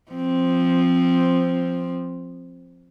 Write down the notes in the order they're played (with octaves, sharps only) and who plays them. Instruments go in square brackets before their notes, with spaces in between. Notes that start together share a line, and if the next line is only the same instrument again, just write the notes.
[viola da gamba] F3 C4